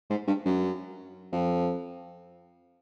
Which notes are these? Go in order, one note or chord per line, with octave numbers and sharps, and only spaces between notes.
G#2
G2
F#2
F2